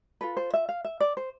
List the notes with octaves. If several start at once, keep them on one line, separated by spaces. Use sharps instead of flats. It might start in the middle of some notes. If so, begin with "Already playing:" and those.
F4 A4 B4
C5
E5
F5
E5
D5
C5